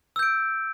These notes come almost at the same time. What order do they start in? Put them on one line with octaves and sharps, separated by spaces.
E6 G6 D7